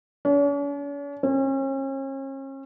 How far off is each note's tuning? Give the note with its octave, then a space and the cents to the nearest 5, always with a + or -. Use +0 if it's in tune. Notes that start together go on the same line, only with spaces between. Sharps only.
C#4 +45
C#4 -40